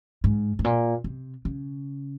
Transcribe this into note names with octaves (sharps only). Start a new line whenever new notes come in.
G#2
G#2
A#2
C3
C#3